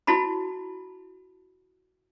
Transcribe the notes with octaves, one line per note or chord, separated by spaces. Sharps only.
E4 F#4 A5 B5